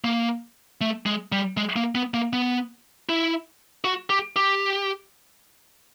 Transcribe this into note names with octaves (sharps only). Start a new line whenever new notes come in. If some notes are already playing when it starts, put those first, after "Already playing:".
A#3
A3
G#3
G3
G#3
A#3
B3
A#3
B3
E4
F#4
G4
G4